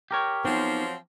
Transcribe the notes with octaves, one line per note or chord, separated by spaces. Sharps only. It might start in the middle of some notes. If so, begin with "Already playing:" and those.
G4 A#4 C#5
F3 F#3 B3 C4 D#4